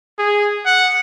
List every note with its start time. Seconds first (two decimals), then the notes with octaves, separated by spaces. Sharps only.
0.18 G#4
0.66 F#5